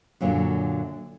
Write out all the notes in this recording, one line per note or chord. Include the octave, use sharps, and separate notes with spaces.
F#2 A#2 D3 F3 F#3